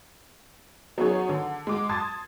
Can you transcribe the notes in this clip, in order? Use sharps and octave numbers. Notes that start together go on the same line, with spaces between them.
F#3 B3 C#4 D#4 G#4 C#5
D3
G#3 D6
A5 C6 D#6 G#6 A6